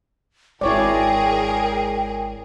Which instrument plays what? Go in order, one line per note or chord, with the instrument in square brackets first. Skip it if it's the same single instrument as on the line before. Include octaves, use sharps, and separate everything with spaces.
[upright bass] G#1 G#3 [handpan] E4 C#5 D5 [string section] G#4 A#4 [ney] G5